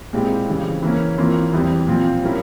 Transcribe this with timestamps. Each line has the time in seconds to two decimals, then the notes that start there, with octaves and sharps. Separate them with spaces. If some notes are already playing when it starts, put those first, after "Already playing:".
0.13 A#2 G#3 C4 E4 G4
0.48 F2 C#3 E3 G3 C4
0.82 E3 A#3 C#4
1.18 F2 E3 A#3 F4
1.53 E2 E3 G3 C4
1.87 A#2 F3 C4 F4
2.23 G3 C#4 E4 A#4